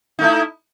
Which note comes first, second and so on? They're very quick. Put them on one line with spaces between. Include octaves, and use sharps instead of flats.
D#4 A3 E4